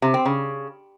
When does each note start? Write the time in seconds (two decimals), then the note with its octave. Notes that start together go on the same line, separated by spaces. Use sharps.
0.02 C3
0.14 C4
0.25 C#3